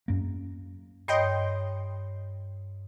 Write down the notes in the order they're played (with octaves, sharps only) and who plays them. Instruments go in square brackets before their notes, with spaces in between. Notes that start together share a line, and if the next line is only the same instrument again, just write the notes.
[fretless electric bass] F#2 A#3
[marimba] G2 C#5 [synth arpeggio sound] D#5 G5 C6